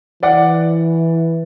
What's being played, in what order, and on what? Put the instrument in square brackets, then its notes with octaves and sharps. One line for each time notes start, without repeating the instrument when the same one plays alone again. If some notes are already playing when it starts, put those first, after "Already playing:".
[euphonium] E3 [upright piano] D5 F#5